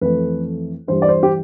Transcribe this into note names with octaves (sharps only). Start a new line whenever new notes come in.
F2 E3 A3 B4
G2 E3 G3 C5
D5
C5
G4